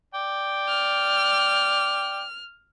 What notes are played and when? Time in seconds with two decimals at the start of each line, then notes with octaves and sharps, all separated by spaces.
0.14 D5 G5
0.68 F6